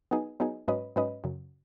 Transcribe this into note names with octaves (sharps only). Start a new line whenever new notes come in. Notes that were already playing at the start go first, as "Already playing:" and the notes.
F#3 B3 D#4 G#4
F#3 B3 D#4 G#4
G#2 F#3 C#4 B4 D#5
G#2 F#3 C#4 B4 D#5
F#2 C#3 F#3